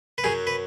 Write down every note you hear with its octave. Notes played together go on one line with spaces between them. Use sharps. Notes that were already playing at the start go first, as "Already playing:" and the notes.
B4
F#2 F#3 G#4
B4